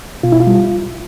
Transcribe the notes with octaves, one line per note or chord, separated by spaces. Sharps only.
B2 F4
E4
F4
G3